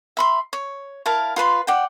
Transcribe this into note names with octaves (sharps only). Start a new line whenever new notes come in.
E5 B5 C6
C#5
E4 A#4 F5 A5
F4 B4 B5 C6
D5 F#5 G5